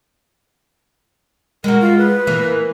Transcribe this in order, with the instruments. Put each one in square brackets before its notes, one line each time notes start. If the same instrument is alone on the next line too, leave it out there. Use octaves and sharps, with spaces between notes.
[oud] G#3 F#4 [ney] A#4
[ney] F4
B4
[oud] E3 A#3